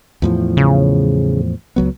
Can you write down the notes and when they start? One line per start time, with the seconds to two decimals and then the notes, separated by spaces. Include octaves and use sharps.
0.22 E2 A2 F3
0.57 C#3
1.76 C#2 F#3 B3